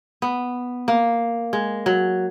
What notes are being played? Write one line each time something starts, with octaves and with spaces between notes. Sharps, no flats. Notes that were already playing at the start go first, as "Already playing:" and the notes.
B3
A#3
G#3
F#3